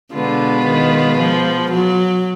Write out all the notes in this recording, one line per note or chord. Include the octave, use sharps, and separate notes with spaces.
B2 D3 G#3 B3 F4
D#3
F3
F#3